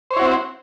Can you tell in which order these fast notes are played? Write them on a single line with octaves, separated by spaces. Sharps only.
C5 C#5 E4 F#4 C4